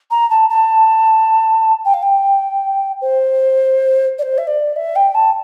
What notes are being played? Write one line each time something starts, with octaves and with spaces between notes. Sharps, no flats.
A#5
A5
A5
G5
F5
G5
C5
D5
C5
E5
D5
E5
G5
A5